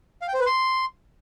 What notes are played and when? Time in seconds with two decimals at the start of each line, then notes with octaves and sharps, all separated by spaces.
0.22 F5
0.28 G5
0.34 C5
0.40 B4
0.46 C6